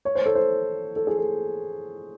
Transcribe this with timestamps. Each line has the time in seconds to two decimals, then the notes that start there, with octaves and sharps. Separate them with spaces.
0.05 C#5
0.15 C5
0.26 A4
0.35 C5
0.96 A4
1.07 G#4
1.18 A4